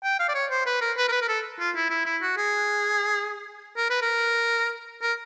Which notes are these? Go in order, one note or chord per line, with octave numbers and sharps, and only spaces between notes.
G5
F5
D5
C#5
C5
B4
A#4
B4
A#4
B4
A#4
A4
F4
E4
E4
E4
F#4
G#4
A#4
B4
A#4
A#4